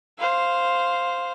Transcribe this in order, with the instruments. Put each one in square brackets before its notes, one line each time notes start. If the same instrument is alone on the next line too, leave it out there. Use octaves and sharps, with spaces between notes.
[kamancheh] C5 F5